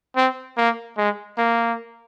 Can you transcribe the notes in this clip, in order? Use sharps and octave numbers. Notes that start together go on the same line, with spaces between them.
C4
A#3
G#3
A#3